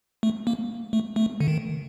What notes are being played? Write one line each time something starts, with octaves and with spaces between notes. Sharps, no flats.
A3
A#3
A3
A3
D3
D#3